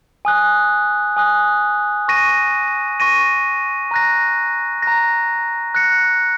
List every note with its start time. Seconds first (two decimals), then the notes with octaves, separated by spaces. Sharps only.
0.25 G#5 D#6 F#6
1.17 G#5 D#6 F#6
2.08 C#6 A#6 D#7
3.00 C#6 A#6 D#7
3.91 A#5 F#6 A#6
4.82 A#5 F#6 A#6
5.75 F#6 A#6 C#7